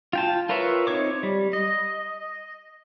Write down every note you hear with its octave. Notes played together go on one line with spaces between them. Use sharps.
F4 G5 A5
F4 A#4 B4 C#5 E5
C4 D#4 C#5 D6
G3
D#5